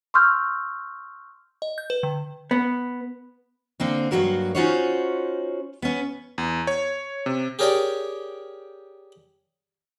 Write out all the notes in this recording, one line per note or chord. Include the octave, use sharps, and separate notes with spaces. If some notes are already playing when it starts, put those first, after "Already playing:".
C6 C#6 E6 F6 G6
D#5
G6
B4
D3
B3
D3 A#3 C4
G2 B2 F#3 A#3 F#4 A#4
C#4 D#4 F4 F#4 C5 C#5
B3 C#4
E2
C#5
C3
G4 G#4 A#4 C#5 D5 G5